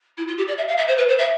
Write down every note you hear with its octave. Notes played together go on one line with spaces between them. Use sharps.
E4
F4
G4
D5
E5
F5
E5
C5
B4
C5
E5